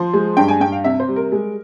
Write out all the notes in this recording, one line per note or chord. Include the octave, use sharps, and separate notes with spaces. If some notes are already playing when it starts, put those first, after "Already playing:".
Already playing: F3 C5
G#3
G2 G5
G#5
G2 G5
F5
C3 E5
C5
G3
A#4
G#3